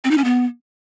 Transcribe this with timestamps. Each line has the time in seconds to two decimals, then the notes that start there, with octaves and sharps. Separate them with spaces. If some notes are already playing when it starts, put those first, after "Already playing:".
0.04 C4
0.11 D#4
0.18 C#4
0.24 B3